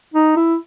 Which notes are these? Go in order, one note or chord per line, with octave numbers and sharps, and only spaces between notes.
D#4
E4